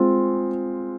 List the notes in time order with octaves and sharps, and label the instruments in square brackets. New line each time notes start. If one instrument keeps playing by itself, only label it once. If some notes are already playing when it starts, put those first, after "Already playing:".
Already playing: [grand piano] G#3 C4 F4